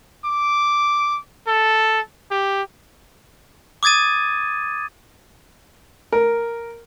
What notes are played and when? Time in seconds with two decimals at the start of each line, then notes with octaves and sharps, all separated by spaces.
0.25 D6
1.48 A4
2.31 G4
3.83 D6 D#6 G#6 A6 D#7
6.12 A#4